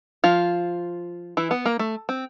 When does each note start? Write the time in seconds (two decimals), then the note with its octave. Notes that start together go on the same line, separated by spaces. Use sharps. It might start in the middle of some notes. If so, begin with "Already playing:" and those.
0.24 F3 F4
1.37 E3 E4
1.51 B3
1.66 A#3
1.79 A3
2.09 C4